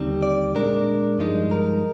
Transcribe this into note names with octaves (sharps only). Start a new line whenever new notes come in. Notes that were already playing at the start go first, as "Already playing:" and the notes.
Already playing: D#2 D3 G3 C4 D#4
D5
A#2 G#3 D4 A#4
G2 F3 G#3 D#4
A#4